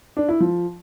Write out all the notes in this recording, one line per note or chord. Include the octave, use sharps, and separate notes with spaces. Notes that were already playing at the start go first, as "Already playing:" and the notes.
D4
E4
F3